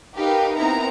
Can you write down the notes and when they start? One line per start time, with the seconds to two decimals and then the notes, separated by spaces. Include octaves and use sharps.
0.15 D#4 G4 A#4 B4 F5
0.56 B3 C4 D#4 E4 A#4 A#5